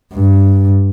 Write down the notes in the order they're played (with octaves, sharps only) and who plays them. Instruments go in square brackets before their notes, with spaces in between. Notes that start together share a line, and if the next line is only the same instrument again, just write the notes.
[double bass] G2